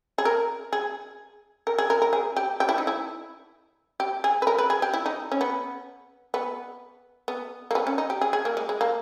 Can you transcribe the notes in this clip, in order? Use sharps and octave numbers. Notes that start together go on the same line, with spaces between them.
G#4
A#4
G#4
A#4
G#4
A#4
A#4
G#4
G4
G4
E4
D#4
E4
G4
G#4
B4
A#4
B4
G#4
G4
E4
D#4
C#4
B3
B3
B3
A#3
B3
C#4
D#4
G4
G#4
G#4
A#3
G#3
G#3
A#3